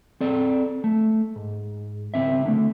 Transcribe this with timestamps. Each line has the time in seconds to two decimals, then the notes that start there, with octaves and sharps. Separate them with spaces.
0.21 C4 A4 D5
0.84 A3
1.36 G#2
2.14 C#2 B2 C4 E5
2.46 D3 A3